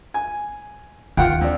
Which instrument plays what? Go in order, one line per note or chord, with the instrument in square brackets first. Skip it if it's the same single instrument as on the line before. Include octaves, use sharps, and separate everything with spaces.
[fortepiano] G#5
[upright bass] D#2 [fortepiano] F4 F#5 G5
[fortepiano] F2 D4